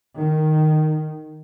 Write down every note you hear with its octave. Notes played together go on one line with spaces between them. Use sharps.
D#3